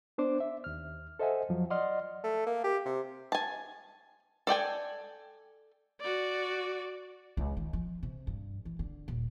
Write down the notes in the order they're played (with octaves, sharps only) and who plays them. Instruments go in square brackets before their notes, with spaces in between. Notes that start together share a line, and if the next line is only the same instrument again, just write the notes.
[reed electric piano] B3 D4 C5 D6
E5
D#2 F6
A4 C5 D#5 E5 F#5 G#5
F2 F3 F#3
D5 D#5 F#5 C6 F6
[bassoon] A3
A#3
G4
C3
[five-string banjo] G#5 A5
A4 D5 G5 G#5
[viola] F#4 D5
[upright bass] C#2
D#3
F3
C3
G2
E3
D3
D#1